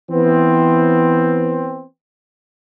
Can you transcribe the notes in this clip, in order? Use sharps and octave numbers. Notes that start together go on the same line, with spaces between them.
E3 B3 C4